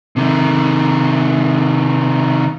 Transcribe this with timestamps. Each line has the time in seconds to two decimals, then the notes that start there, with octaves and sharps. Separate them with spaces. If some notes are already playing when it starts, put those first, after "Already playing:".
0.16 C3 D#3